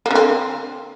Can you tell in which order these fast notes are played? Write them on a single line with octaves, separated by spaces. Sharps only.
A#3 D3 C4